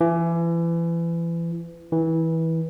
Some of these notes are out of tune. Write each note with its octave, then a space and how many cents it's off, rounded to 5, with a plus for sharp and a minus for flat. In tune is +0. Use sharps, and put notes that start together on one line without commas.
E3 +30
E3 -20